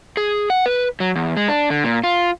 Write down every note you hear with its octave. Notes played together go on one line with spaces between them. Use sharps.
G#4
F#5
B4
F#3
E2
G#3
D4
D3
A#2
F4